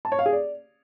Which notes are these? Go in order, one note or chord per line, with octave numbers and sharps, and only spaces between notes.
A5
C#5
F5
G#4
D5